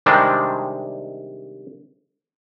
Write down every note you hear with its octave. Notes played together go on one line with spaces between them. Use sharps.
C3 D#3 G3 G#3 C4 D4